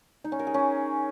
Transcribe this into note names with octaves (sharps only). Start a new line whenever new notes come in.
D#4
C#4
A#4
G#4
C#4